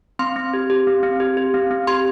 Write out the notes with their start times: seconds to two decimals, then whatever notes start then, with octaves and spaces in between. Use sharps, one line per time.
0.19 C4 C6
0.36 C4
0.54 G4
0.70 G4
0.87 C4
1.03 C4
1.20 G4
1.37 G4
1.54 C4
1.71 C4
1.87 G4 C6